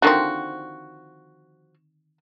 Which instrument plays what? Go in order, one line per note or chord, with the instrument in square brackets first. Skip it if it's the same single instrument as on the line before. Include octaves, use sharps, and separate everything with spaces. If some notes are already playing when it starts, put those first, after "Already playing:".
[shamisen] D3 D#3 C4 [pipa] F3 F#4